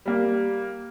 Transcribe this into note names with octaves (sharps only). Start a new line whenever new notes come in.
G3 A#3